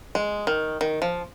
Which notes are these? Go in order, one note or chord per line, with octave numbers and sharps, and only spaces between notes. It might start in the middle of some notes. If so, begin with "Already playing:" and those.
G#3
D#3
D#3
F3